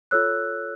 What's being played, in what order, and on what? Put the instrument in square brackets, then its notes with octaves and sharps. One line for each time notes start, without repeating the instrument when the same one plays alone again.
[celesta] F4 A4 C#5 E6 F#6